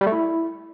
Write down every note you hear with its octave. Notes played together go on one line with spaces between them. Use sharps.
G3
A3
E4